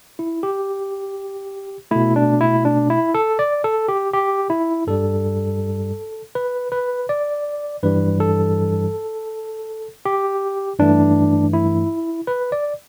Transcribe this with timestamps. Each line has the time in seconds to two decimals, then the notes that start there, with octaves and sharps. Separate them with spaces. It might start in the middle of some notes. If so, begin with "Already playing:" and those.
0.19 E4
0.43 G4
1.91 B2 A3 E4
2.16 D4
2.41 E4
2.65 D4
2.90 E4
3.14 A4
3.39 D5
3.64 A4
3.88 G4
4.13 G4
4.50 E4
4.87 G2 G3 A4
6.35 B4
6.72 B4
7.09 D5
7.83 G2 E3 G3 B4
8.20 A4
10.05 G4
10.79 G2 E3 A3 D4
11.53 E4
12.27 B4
12.52 D5